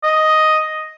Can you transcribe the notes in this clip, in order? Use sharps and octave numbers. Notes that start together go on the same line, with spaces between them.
D#5